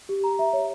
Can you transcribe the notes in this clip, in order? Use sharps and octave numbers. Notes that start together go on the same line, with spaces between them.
G4
A#5
E5
C#5